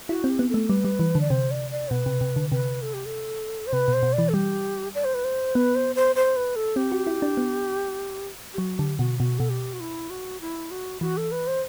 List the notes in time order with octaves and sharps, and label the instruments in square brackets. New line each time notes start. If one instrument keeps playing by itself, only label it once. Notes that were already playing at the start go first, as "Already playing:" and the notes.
[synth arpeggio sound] E4 [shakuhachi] F#4
[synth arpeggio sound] C4
[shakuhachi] G4
[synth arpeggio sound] B3
[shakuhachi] A4
[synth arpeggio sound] A3
[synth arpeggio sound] G3 [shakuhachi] B4
[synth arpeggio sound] G3
E3
D3
[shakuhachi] D5
[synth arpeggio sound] C3 [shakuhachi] C5
[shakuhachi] D5
D5
[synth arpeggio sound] B2 [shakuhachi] B4
[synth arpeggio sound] C3
C3
D3
[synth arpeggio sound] C3 [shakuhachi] B4
[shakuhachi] A4
G4
A4
C5
[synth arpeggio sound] C3 [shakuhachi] B4
[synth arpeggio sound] B2
[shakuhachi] C5
[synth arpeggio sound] B2
[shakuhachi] D5
[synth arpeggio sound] E3
[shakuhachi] A4
[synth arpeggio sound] G3 [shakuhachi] G4
[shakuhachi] D5
C5
B4
C5
[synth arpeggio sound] B3 [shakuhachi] B4
[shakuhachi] C5
C5
C5
B4
A4
[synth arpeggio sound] C4 [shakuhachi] G4
[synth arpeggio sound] F#4
E4
D4
B3
[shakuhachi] G4
[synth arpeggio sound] F#3 [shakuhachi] F#4
[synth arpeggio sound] D3 [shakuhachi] G4
[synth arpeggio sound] B2 [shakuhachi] F#4
[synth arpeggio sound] B2 [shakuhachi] F#4
[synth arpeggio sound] B2 [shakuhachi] A4
[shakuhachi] G4
F#4
E4
F#4
E4
F#4
[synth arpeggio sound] E3 [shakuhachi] F#4
[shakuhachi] A4
B4
C5